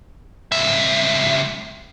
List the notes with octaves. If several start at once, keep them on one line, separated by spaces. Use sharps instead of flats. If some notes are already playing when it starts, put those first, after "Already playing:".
C#2 E5